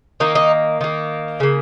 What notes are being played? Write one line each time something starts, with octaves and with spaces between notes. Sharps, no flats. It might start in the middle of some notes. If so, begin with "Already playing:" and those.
D#3 A#3 D#4
D#4
D#3 A#3
C#3 A#3